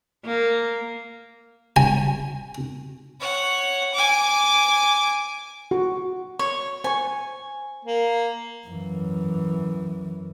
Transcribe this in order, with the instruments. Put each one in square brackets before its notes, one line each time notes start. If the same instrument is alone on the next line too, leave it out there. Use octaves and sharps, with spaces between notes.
[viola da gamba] A#3
[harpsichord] G#5
[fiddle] C#5 F#5
G#5 D6
[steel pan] F#4
[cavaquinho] C#5 [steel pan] C#6
[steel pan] C5 C#6 [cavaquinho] G#5
[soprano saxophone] A#3
[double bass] F#2 E3